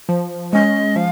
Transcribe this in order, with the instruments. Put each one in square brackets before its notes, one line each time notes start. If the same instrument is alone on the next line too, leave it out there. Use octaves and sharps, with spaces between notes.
[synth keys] F3
[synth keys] G#3 C#4 [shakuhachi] D#5
[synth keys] F3 [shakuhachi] F5